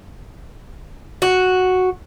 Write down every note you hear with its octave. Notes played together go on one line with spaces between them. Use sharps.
F#4